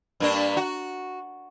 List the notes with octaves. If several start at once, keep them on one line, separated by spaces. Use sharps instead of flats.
G2 A#3 D4
F#4